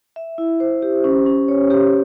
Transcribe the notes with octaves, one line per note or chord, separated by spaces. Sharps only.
E5
E4
C5
G4
C#4
C#4
C#5
G4